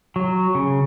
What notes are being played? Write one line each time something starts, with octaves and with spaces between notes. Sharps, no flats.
F#3
C#3